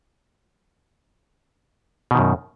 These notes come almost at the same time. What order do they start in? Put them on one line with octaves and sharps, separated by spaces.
B2 D#3 F#2